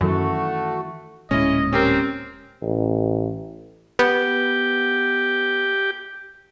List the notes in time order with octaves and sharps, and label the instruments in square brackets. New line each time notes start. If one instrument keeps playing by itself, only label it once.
[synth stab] F#2 [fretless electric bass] D#3 E3 [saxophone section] A3 [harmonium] F#4
[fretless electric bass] D1 A#2 G#3 [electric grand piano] C#4 E4 [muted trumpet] D#5
[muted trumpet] C4 [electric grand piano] C#4 G4 A#4
[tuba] A1
[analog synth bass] B3 [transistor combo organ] G4